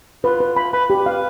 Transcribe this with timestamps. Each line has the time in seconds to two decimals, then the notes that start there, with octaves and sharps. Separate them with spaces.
0.24 F4 B4
0.40 B4
0.57 B5
0.73 B4 B5
0.90 G4
0.99 B4
1.06 F5